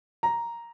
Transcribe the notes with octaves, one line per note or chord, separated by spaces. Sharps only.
A#5